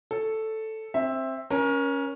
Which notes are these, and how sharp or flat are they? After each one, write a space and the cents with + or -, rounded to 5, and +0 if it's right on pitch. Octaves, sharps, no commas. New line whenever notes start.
A4 +0 C#5 +0
C4 +15 E5 +0
C#4 +0 A#4 +30